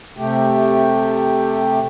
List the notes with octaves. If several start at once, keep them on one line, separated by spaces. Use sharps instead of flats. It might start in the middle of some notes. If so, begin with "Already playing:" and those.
C3 A3 G4